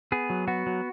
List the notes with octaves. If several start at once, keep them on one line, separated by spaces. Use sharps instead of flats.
B3 G#4
F#3
B3 F#4
F#3